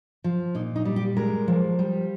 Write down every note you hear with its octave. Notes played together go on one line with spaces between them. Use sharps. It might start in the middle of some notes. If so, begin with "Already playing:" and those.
F3
A#2 D#4
D#4
G3
G4
G#3 A#4
F3
G3